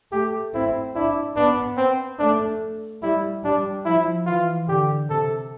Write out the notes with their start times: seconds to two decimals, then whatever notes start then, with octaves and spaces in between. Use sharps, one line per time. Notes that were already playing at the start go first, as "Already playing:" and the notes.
0.12 A3 G4
0.54 C4 E4
0.95 D4 E4
1.36 B3 D4
1.77 C4
2.19 A3 D4
3.02 G3 E4
3.43 G3 D4
3.85 F3 E4
4.26 E3 F4
4.68 D3 G4
5.09 C3 A4